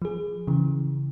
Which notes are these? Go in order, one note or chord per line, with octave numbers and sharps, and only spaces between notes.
F3 G#4
C#3 E3